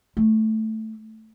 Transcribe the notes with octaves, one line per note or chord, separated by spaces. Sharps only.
A3